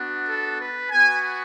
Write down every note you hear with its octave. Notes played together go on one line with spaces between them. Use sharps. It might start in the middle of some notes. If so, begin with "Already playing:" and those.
Already playing: B3 D4 F#4
A4
B4
B3 F#4 G#5